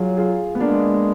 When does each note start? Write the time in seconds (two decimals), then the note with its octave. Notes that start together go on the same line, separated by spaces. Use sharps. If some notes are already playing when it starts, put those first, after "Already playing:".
Already playing: F#3 F4 G#4
0.17 F4 G#4
0.55 B3
0.60 G#3 A#3 D4